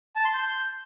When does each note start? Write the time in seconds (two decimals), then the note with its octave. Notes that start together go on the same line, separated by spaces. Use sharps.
0.16 A5
0.25 C6
0.34 G6